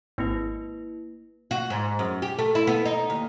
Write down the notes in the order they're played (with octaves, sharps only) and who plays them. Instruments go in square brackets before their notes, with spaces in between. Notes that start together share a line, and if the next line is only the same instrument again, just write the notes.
[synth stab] G#1 [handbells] A#3 E4 B4
[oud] F#4
G#2
F#2
G4
A3
E4
B3
D#4
D#2